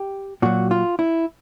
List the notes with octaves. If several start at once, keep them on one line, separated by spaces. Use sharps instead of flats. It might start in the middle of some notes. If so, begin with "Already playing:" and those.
Already playing: G4
A#2 F#3 F#4
F4
E4